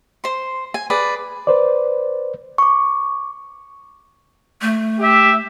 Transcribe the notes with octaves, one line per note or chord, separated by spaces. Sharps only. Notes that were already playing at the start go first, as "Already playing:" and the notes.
C5 C6
G#5
G#4 B4 D5
B4 C5 D5
C#6 D6
A3
G4 E5